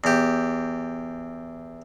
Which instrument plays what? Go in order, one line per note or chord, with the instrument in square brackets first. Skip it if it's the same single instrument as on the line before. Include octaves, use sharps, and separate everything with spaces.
[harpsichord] E2 G4